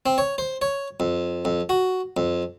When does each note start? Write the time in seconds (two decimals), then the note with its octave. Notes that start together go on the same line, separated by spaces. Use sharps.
0.06 C4
0.18 C#5
0.38 C5
0.62 C#5
1.00 F2
1.45 F2
1.69 F#4
2.17 F2